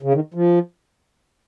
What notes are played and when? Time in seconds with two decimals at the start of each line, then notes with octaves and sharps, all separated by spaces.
0.02 C#3
0.14 D#3
0.34 F3